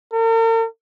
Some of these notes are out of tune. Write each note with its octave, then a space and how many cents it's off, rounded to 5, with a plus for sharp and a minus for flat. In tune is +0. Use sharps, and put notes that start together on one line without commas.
A#4 -45